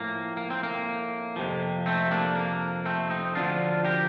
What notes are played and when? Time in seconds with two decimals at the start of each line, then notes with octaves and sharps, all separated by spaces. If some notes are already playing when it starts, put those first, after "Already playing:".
Already playing: A2 F3 A#3
0.37 A#3
0.50 C4
0.63 A#3
1.36 F2 C3 F3
1.86 A3 C4
2.11 A#3 D4
2.36 A#3
2.85 A3 C4
3.10 C4 D#4
3.35 D2 D3 F3 D4 F4
3.85 G4 A#4